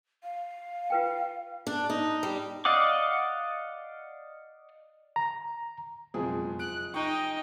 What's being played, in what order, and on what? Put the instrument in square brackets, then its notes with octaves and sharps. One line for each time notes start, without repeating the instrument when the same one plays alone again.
[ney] F5
[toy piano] F4 B4 G5
[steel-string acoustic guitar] D4
D#4
G3
[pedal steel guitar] D5 D#5 F5 F#5 D6
[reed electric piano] A#5
[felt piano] F#1 F3 G#4 [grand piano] F2 B2 G#3
[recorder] F#6 [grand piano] D7
[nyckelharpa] D#4 D#5 [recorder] G5 [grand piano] C#6